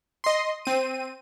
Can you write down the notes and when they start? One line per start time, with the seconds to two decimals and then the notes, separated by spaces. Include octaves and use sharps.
0.24 D#5 C6
0.65 C4 D#7